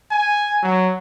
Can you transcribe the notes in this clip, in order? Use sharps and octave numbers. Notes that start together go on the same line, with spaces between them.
G#5
F#3